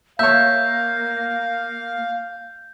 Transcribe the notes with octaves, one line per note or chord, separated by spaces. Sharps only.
A#3 C#5 E5 F5 G6